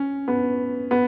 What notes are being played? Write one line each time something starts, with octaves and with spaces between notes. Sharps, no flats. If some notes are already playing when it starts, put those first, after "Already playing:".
Already playing: C#4
B3
B3